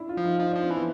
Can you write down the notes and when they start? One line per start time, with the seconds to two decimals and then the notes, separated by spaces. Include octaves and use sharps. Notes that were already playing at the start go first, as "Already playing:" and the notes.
Already playing: C#4 D4 E4
0.09 F4
0.17 F3
0.25 D#4
0.39 F3 D#4
0.51 F3 D4
0.63 C4
0.70 E3
0.75 B3